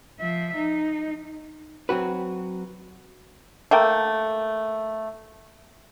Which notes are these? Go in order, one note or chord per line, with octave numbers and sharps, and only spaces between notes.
F3 E5
D#4
F#3 C4 F#4 B4
A3 A#3 G5